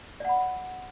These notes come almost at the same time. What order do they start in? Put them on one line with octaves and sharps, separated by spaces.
D5 F#5 B5